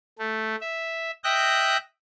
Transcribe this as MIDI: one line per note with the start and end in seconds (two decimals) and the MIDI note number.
0.18 0.55 57
0.61 1.11 76
1.24 1.77 75
1.24 1.77 76
1.24 1.77 79
1.24 1.77 90
1.24 1.77 91
1.24 1.77 94